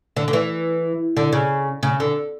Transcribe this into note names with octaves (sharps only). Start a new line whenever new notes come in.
D3
D3
E3
D3
C#3
C#3
D3